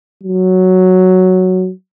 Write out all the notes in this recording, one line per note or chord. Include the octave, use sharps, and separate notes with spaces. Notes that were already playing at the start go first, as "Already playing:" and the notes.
F#3